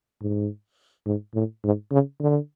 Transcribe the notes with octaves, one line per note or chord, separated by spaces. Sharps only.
G#2
G#2
A2
G#2
C#3
D3